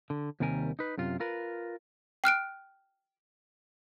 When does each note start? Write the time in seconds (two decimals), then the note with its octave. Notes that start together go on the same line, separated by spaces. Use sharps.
0.10 D3
0.40 D#2 C3 D#3 G3 A#4 G#5
0.79 D#4 B4
0.98 F#2 C3 F4
1.20 F4 A#4 B4
2.24 G5 F6 F#6 D7